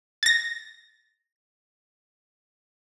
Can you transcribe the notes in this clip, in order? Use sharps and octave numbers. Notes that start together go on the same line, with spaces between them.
A6 A#6